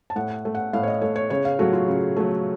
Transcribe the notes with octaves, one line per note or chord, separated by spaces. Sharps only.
A5
A2 F#5
A3
F#5
A2 F5
C#5
D#5
A3 C#5
C#5
C#3 C#5
F5
F#3 A3 F#4
F4
C#3
F#3 A3